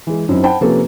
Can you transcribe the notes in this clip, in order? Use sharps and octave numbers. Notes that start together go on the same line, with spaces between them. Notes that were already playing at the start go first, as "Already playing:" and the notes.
E3 G#3
F#2 F#3 C4 D#4 E4
C5 F#5 G5 A5 B5
C3 F3 A#3 C#4 A4 B4